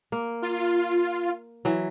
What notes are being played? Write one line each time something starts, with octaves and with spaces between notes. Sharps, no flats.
A#3
F4
E3 F#3